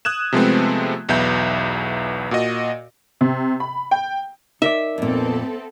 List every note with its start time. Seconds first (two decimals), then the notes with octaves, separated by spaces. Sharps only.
0.05 D#6 F#6 G#6 E7
0.32 C3 F3 G#3 A3 B3 C4
1.09 B1 E2 B3 E5 G6
2.31 A#2 F#4 D#5
3.21 C3
3.60 B5
3.91 G5
4.62 D#4 A#4 D5 E5
4.98 F2 A#2 B3 C4 A4